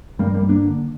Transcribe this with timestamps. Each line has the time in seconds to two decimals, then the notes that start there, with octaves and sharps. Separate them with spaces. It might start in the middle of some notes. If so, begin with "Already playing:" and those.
0.19 G2 G3 A#3
0.34 G3 A#3
0.41 G2
0.49 A#3 D4
0.64 D3